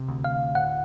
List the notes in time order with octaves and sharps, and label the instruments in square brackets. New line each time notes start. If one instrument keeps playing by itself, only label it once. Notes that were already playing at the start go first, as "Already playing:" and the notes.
Already playing: [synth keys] C3
D2
[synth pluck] F5
[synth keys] A2 [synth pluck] F#5